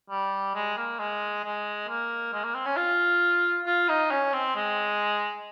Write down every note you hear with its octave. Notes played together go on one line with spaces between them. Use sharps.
G3
G#3
A#3
G#3
G#3
A#3
G#3
A#3
C4
C#4
F4
F4
D#4
C#4
C4
G#3